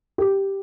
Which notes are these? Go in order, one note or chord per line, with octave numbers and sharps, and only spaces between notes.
G4